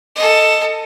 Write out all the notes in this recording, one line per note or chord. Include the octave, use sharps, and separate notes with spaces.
A4 D#5